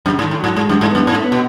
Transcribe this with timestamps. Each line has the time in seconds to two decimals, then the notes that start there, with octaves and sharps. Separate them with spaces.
0.06 F#2 C#3
0.19 G#2
0.23 D#3
0.31 A2
0.40 G#2 F#3
0.56 G#2 G#3
0.69 F#2
0.73 G#3
0.81 G#2 A3
0.90 F#2 B3
1.07 G#2 C#4
1.16 A3
1.24 B3
1.32 B2